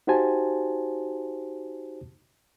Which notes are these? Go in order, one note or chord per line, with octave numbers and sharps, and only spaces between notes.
D#4 F#4 G4 C5 G#5 A5